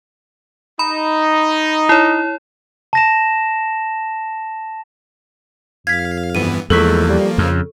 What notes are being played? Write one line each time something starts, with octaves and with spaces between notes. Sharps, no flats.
D#4 B5
E4 C#5
A5 A#6 E7
F2 F5 G#6 B6
G2 E3 B3 D#7
E2 F3 G#3 A#3 A4 C#6 B6
G3
F2 C#3